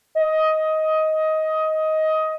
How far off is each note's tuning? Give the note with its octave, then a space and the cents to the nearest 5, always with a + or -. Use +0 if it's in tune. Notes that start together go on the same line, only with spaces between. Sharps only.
D#5 +15